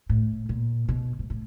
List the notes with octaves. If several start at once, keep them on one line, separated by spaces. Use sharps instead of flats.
A2
A#2
B2
G#2
A2